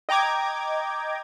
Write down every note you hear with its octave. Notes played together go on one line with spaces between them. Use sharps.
D#5 G5 A#5 D6 G#6